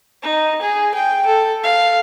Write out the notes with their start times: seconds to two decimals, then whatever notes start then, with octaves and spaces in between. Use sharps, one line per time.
0.23 D#4
0.62 G#4
0.95 G5
1.26 A4
1.63 F5